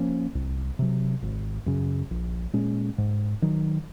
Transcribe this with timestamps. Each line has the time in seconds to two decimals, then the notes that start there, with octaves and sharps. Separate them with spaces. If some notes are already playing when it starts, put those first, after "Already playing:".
Already playing: F3 A#3 C#4
0.35 C2
0.79 C3 F#3
1.22 G#1
1.66 F#2 C#3
2.11 A#1
2.53 A#2 G#3 C#4
2.98 G#2
3.42 D#3 F#3